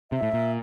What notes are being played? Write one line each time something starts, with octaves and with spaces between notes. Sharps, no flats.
C3 E5
A2
A#2